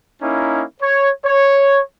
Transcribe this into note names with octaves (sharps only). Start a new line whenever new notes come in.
A#3 C#4 D#4 E4
C#5
C#5